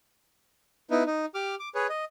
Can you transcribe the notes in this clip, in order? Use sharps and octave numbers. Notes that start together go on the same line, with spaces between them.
B3 D#4 E4
D#4
G4 D6 F6
D6
G#4 B4 C#5
D#5